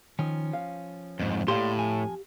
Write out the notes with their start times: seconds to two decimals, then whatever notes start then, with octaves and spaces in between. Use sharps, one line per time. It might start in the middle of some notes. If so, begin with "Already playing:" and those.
0.19 D#3 F3 C#4
0.53 F5
1.19 F2 G#2
1.48 A2 A#3 G4 D5 F5 C6
1.76 F2 F3 G#5